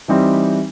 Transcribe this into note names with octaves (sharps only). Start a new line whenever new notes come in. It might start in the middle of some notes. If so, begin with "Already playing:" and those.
E3 G3 C4 D#4 G4